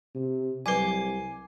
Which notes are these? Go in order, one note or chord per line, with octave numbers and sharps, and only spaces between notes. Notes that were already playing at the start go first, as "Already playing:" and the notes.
C3
C2 F#3 B4 G#5 D6 C7